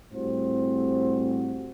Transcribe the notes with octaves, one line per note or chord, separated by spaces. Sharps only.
A2 G3 C4 F#4 C5